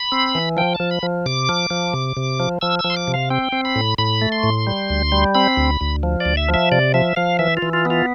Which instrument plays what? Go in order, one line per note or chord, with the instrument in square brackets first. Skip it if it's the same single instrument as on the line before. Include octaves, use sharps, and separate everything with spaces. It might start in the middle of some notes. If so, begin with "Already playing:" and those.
Already playing: [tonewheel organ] B5
C4
E3
F3 G5
A5
F3
B5
F3
C3 D6
F3
F3
C3
C3
F3
F3 E6
E6
F3
C6
D6
C3
F5
C4 G5
C4
B5
A2
A2 B5
A3
C6
A2
G3
D2
G3
C4 B5
D2
D2
F3
D5
D2
E5
F3
E5
C3 D5
F3 E5
F3 F5
E3 E5
F4
E3
F4
B3
F4